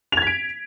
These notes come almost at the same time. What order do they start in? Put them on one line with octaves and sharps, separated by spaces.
F7 G#6 B6 D7